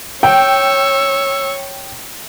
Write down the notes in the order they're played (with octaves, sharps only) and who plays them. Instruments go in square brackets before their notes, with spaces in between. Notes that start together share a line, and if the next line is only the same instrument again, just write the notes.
[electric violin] C#5 [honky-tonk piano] G5 [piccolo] E6